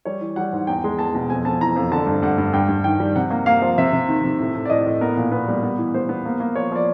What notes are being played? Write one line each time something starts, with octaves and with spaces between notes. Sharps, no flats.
G3 C#5
E3
G3 F#5
G#2
E2 G5
G#3
E2 A5
B2
F2 G#5
F2 A5
E3 A#5
F2
D3 A5
G2
G2 F#5
G2
G2 G5
G2
D#3 G5
G3
C3 F#5
A#3
A#3 F5
F3
C3 E5
C3
D#3
C3
A2
A2
D5
A2 D#5
A2
B3 A#4
A#2
B3 B4
G3
B3
E3
B3 C5
B3
A#3
A#3
F3 C#5
F3 D5